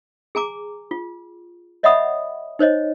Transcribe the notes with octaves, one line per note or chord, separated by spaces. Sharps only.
G#4 G#5 A#5 D6
F4
C#5 D#5 E5 F#5 B5 D#6
D#4 C5 C#5 D#5